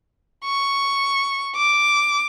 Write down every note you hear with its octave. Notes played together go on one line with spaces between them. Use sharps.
C#6
D6